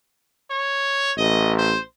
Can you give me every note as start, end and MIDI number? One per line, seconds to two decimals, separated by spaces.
0.51 1.12 73
1.17 1.75 33
1.17 1.53 75
1.58 1.81 72